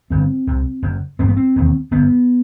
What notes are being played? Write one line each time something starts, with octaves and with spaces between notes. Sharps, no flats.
G1 G2 C4
C2 C3
F#1 F#2
A1 G2 C4
B3
C4
E1 D#2
G1 F#2 B3